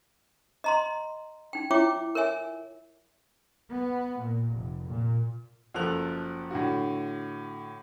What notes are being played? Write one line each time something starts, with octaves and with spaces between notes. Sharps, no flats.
D#5 A#5 C6
D#4 G5
E4 F4 C#5 E5 G5 D6
A#4 C#5 E5 G#5
B3
A#2
F1
A#2
F#1 F3 A4 F#6 F7
A2 D3 F#4